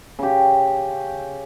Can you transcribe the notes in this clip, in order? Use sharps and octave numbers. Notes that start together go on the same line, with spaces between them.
C#3 G4